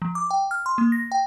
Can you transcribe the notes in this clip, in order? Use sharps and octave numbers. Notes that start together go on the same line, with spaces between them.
F3
D6
G5
F6
C6
A#3
A#6
G5